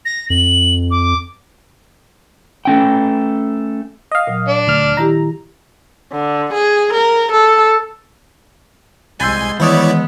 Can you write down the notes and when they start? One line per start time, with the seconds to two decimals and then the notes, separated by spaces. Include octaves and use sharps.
0.05 A#6
0.30 F2 F#7
0.91 D6
2.65 A3 C#4 G5
4.12 D#5 F5
4.27 A#2 F#3
4.48 D4
4.68 D2 F6
4.97 D#3 E4 G4 A#5
6.13 D3
6.54 G#4
6.93 A#4
7.32 A4
9.20 C2 G#3 G#5 C6 E6 G6 A6
9.60 D#3 E3 G#3 B3 E4 C#5 D5 D#6